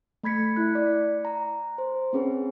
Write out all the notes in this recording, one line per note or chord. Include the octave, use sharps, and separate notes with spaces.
A3 B5 G#6 B6 C#7
E4 F#6
D5
A#5
C5
C4 C#4 G#4 B4